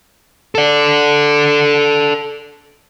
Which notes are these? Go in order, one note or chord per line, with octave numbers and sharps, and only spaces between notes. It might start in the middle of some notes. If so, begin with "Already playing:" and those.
A4 D5